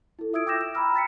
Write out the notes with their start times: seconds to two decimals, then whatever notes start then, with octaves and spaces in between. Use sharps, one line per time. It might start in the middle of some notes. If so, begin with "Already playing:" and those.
0.19 E4 A4
0.33 F4 E5 D#6 E6 G#6 D7
0.46 G5 D6 E6 G6 A#6 E7
0.61 E7
0.74 G5 A#5 B5 E6 F6
0.94 G5 A6 B6 C#7